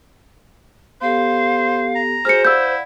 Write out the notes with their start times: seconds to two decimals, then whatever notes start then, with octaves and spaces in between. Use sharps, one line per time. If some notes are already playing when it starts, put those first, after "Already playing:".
1.01 B3 G4 A4 C5 F5
1.95 A#5
2.25 F#4 G#4 C5 G#5 F6 C#7
2.45 E4 D5 F5 F#5 E6 G6